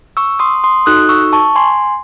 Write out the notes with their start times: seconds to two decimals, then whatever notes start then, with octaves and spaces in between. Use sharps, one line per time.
0.17 C#6 E6
0.39 C6 D#6
0.64 C6 D#6
0.86 D#4 F#4 A4 D#6 F#6
1.09 C#6 E6
1.33 A5 C#6
1.55 G#5 C6